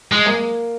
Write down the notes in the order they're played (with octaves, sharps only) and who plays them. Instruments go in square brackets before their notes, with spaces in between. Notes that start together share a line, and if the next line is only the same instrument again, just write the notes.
[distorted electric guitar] G#3
[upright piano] A#3